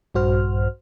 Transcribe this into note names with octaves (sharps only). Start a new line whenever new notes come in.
A#1 G2 F#4 C5 F6